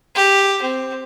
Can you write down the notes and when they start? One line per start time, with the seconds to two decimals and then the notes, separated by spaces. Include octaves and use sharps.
0.15 G4
0.62 C4